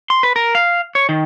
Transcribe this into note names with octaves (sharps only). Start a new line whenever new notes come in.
C6
B4
A#4
F5
C#5
D#3